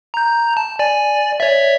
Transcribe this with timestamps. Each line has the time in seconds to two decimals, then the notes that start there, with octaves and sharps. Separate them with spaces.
0.14 A#5 G6
0.57 A5
0.79 D5 G#5
1.40 C#5 D5 E5